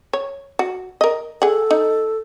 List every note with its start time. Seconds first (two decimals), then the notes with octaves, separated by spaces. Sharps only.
0.13 C#5
0.59 F#4
1.01 A#4 D#5
1.42 G#4 A4 F#5
1.71 D#4